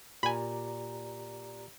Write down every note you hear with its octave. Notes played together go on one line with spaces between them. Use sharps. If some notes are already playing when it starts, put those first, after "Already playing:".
A#2 G4 D5 G#5 A#5 B5